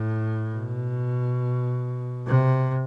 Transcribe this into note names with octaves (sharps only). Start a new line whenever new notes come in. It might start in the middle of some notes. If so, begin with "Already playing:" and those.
Already playing: A2
B2
C3